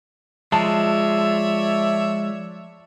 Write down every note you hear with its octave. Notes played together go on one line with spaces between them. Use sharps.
F3 G#3 C#5 D5 E5 A5